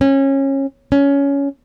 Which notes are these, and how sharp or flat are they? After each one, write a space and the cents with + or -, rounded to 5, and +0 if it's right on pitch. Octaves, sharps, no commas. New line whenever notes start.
C#4 -25
C#4 +15